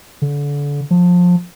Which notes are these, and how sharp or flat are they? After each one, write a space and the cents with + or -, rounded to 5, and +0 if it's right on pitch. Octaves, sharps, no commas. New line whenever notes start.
D3 -30
F3 +25